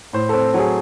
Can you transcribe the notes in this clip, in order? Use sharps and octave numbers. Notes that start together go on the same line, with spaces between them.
A2 C5
C4 A4
F#3
G#4